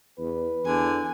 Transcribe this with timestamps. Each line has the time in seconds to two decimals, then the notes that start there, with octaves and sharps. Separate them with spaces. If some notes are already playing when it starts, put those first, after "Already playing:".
0.19 E2 B4
0.65 E2 D3 G#5